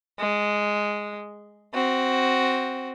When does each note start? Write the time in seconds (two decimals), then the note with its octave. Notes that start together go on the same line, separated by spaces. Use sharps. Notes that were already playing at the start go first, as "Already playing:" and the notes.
0.19 G#3
1.74 C4 F#4